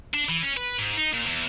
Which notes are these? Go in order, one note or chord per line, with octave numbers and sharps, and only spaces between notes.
D4
E3
C#4
B4
G#2
D#4
A#2
E2